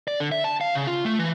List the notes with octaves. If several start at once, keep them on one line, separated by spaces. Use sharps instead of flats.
D5
D3
E5
A5
F5
C#3
F4
A3
E3